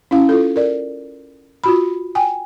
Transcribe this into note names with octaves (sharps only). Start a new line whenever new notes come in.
C#4 E4 F5
F4 A4
A#4 D5
F4 F#4 B5
G5 G#5